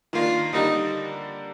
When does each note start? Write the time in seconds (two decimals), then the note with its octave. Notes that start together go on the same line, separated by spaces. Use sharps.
0.13 D#3 A#3 D4 F4
0.52 D3 G3 A#3 D4 D#4 G4